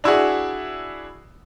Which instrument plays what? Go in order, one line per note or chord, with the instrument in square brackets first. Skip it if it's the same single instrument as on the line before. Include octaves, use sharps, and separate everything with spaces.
[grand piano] D4 E4 F#4 G#4